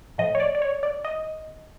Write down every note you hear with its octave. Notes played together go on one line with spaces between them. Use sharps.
A2 F3 D#5
C#5
D5
D5
C#5
D5
D#5